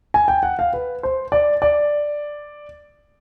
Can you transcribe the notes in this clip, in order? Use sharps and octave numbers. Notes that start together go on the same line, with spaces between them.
G#5
G5
F#5
F5
B4
C5
D5
D5